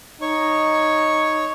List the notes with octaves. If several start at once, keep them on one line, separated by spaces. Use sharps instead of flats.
D#4 C#5 C#6